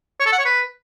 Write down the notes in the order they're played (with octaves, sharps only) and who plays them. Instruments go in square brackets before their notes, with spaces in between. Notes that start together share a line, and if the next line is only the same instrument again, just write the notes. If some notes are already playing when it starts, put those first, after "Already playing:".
[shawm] C#5
A4
F#5
C#5
B4